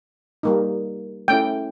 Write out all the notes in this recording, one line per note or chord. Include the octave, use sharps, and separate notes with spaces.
G3 A#3 D#4
A3 C#4 E4 G5